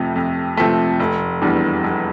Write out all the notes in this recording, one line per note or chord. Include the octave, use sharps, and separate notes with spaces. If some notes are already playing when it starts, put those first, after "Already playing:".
Already playing: F2 C3 F3 A3
F2
C3 F3 A3
F1
E2 E3 G3 D4
F1